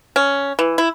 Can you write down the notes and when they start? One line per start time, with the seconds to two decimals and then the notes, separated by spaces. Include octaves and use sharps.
0.16 C#4
0.59 E3
0.78 E4